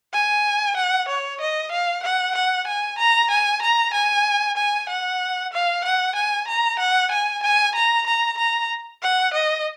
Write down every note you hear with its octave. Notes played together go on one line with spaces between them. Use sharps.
G#5
F#5
C#5
D#5
F5
F#5
F#5
G#5
A#5
G#5
A#5
G#5
G#5
F#5
F5
F#5
G#5
A#5
F#5
G#5
G#5
A#5
A#5
A#5
F#5
D#5